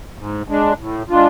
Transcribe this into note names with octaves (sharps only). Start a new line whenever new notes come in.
G#2
G#3 D4
A2
G#3 D4 F4